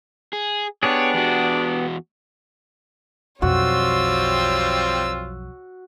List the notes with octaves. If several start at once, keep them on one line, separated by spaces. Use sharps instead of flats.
G#4
B3 D4 G4 G#4 C#5
E2 F#4
B1 F2 G3 C4 F4 F#4 C#5 E6